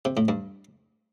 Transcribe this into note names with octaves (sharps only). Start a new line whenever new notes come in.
C3
A2
G2